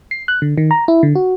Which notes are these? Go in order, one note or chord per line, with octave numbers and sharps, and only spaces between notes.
C7
F#6
D3
D#3
A#5
E4
D3
F#4